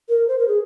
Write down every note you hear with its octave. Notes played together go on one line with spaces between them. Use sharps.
A#4
C5
A#4
G#4